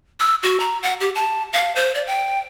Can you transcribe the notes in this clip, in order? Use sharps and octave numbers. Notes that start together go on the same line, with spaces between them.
E6
F#4
A#5
F#5
G4
A5
F5
C5
D5
G5